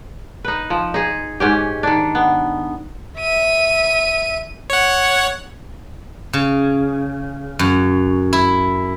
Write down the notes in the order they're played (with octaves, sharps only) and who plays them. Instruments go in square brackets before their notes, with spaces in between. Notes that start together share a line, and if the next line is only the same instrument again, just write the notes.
[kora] D#4 B4
F3
D#4 G#4
G#2 C#4 G4
D#3 D4
B3
[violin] E5 D#7
[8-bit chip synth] C#5 F#5
[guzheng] C#3
F#2
E4